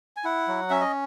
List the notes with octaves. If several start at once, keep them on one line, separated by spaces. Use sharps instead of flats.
G#5
E4 F#5
F#3
C#4 E5
D#5